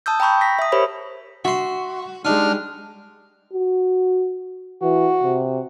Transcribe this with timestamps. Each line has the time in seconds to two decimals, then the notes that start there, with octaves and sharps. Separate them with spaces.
0.06 A5 D#6 E6 G6
0.20 G5 A#5 B5 C#6 G6
0.41 A#6 B6
0.59 E5 D#6
0.72 G4 A#4 C5 C#5 B5
1.45 F#4 E5 C6
2.25 G3 G#3 D4 D#4 F6
3.53 F#4
4.82 E3 F#4
5.23 C3